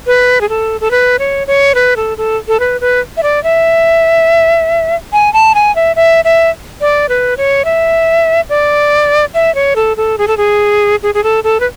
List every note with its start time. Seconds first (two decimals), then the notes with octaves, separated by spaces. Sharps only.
0.07 B4
0.41 G#4
0.49 A4
0.81 A4
0.91 B4
1.19 C#5
1.47 C#5
1.75 B4
1.96 A4
2.18 A4
2.48 A4
2.60 B4
2.81 B4
3.17 E5
3.23 D5
3.44 E5
5.13 G#5
5.34 A5
5.55 G#5
5.76 E5
5.96 E5
6.25 E5
6.81 D5
7.09 B4
7.37 C#5
7.65 E5
8.49 D5
9.34 E5
9.55 C#5
9.76 A4
9.97 A4
10.18 G#4
10.28 A4
10.37 G#4
11.03 G#4
11.15 G#4
11.24 A4
11.44 A4
11.60 B4